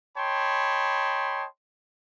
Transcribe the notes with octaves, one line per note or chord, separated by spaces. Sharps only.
C#5 D#5 G5 A5 B5 C6